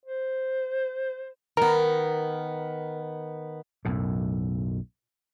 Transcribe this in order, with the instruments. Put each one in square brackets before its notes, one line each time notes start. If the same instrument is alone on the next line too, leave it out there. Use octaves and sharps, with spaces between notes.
[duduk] C5
[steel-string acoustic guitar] D#3 B3 [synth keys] A#4
[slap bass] B1 F#2 A2